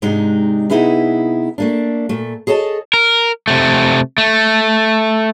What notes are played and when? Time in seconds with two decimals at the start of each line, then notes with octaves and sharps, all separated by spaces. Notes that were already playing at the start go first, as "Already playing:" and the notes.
0.02 G#2 C3 G#3 D4 D#4
0.70 C3 B3 D#4 E4 G#4 B4
1.58 A3 A#3 D4
2.09 A#2 A3
2.47 G#4 A4 C#5 D#5 A5
2.94 A#4
3.48 C3 A3
4.18 A3